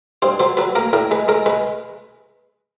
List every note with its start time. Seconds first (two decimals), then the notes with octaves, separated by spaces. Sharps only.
0.22 G2 C5
0.39 F#3 C5
0.57 F#3 B4
0.75 A#3 A#4
0.93 A2 A#4
1.11 G#3 B4
1.28 G#3 A#4
1.46 G#3 B4